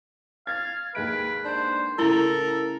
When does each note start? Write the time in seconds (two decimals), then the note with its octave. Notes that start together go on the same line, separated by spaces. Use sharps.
0.47 F5 G#6 A6
0.95 D#2 G#3 B4 D7
1.45 D4 C5
1.99 A2 C#3 E4 A4 A#4